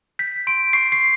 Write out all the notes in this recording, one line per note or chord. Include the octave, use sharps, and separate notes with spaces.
G6 B6
C6 D7
C#6 C7
C7